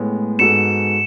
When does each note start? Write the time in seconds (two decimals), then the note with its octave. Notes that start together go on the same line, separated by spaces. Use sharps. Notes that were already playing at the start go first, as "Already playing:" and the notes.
Already playing: A2 G#3 B3
0.39 G#2 G#3 B3 F#4 A4 C#7 E7